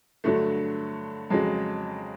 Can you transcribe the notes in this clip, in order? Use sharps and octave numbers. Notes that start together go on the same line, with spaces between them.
G2 D3 F#3 A3
F2 C#3 F#3 G#3